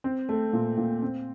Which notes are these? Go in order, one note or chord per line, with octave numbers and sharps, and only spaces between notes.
C4
A3
A#2
A#2
C4